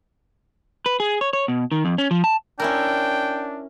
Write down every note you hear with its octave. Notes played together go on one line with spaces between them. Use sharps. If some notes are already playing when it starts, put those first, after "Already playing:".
B4
G#4
C#5
C#5
B2
D#3
F2
C#4
F3
A5
C#4 D4 E4 A#4 G5